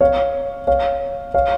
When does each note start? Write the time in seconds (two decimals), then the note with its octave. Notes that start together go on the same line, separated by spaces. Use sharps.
0.01 C#5 F5
0.67 C#5 F5
1.34 C#5 F5